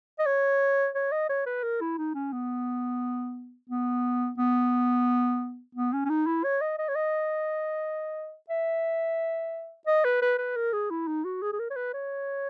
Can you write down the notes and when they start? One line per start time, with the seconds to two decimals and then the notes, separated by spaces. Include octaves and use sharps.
0.19 D#5
0.26 C#5
0.95 C#5
1.12 D#5
1.29 C#5
1.46 B4
1.63 A#4
1.81 E4
1.98 D#4
2.15 C#4
2.32 B3
3.70 B3
4.38 B3
5.75 B3
5.93 C#4
6.05 C#4
6.10 D#4
6.27 E4
6.44 C#5
6.61 D#5
6.78 D#5
6.89 C#5
6.95 D#5
8.50 E5
9.87 D#5
10.04 B4
10.22 B4
10.38 B4
10.56 A#4
10.73 G#4
10.90 E4
11.07 D#4
11.24 F#4
11.42 G#4
11.53 G#4
11.59 A#4
11.70 C#5
11.76 B4
11.93 C#5